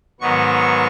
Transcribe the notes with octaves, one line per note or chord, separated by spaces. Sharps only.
G#2 D#3 F#3 B3 C#6